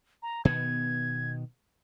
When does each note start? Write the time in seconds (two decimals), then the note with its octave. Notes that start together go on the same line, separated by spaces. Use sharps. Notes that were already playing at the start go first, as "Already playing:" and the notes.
0.23 A#5
0.45 B2 D#3 B3 G#6